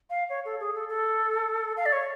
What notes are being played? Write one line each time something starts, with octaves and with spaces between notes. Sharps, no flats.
F5
C#5
A4
G#4
A4
A4
F5
D5
C#5